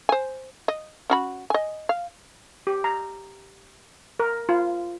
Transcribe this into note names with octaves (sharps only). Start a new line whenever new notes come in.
C5 G#5
D#5
C#4 F#4 B5
D#5 G#5
F5
G4
A#5
A#4
F4